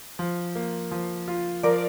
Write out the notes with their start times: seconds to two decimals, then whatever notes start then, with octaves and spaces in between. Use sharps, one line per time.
0.19 F3
0.55 A#3
0.91 F3
1.28 F4
1.63 F3 A#4 D5